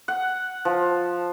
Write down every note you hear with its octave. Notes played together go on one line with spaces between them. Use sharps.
F#5
F3